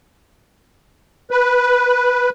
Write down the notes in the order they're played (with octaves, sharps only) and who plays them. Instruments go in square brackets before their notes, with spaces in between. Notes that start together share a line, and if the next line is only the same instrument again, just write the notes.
[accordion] B4